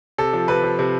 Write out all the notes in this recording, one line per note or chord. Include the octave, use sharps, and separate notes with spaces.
C3 A4
F3
C3 B4
F3
C3